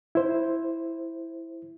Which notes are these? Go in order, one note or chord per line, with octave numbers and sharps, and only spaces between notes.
E4 C5